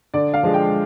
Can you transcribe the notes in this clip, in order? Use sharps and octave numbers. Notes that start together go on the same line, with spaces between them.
D3 D5
F5
F3 G#3 D4
G5